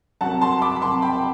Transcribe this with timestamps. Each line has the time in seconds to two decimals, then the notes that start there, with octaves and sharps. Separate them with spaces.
0.21 C2 C3 F#3 F#5 A5
0.41 A5 C6
0.62 B5 D6
0.76 B5
0.82 C2 C3 F#3 A5 C6
1.02 G5 B5